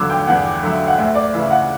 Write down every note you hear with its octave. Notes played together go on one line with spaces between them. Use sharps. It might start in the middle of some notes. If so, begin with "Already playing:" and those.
Already playing: E2 D3 F#3 D6 E6
G5
E2 F#5
D3 F#3 E5
F#5
D2 E5
D5
C#3 E3 E5
F#5